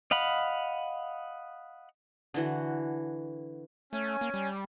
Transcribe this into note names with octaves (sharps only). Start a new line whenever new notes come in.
D#5 F5 F#5 B5
D3 E3 F#4
A3 C#4 G#5
A#3
G3